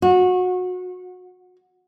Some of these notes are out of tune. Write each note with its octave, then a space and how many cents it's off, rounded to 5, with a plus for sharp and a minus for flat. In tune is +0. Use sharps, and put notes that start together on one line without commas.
F#4 -25